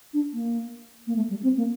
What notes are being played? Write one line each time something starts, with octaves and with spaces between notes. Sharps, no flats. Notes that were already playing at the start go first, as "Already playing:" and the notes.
D4
A#3
A#3
A3
G3
C4
A#3